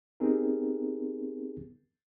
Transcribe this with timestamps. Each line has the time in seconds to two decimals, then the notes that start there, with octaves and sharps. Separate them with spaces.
0.20 B3 C4 D#4 G4 G#4 A#4